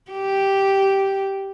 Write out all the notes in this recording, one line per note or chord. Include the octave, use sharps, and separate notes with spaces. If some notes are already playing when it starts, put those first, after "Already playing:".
G4